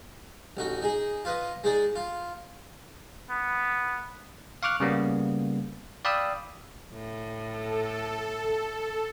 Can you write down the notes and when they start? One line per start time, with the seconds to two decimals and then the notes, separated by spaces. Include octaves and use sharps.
0.57 A1 D#4 F#4
0.82 D#4 G#4
1.25 F4 B4 D#5
1.64 G#3 D#4 G#4 D5
1.96 F4
3.30 B3
4.63 F5 C#6 D6 F6 F#6
4.80 C#3 G3 A#3 B3
6.05 D5 F5 G5 B5 D#6 E6
6.93 A2
7.44 A4